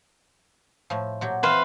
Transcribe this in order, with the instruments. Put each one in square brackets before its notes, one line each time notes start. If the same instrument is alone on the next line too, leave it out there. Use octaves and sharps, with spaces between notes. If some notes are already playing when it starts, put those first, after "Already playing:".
[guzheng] A2 F3
A#2 F#3 G4
[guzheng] E3 C4 [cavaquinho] B4 C5 F5